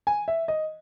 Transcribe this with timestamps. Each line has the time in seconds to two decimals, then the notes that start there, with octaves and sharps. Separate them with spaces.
0.07 G#5
0.28 E5
0.48 D#5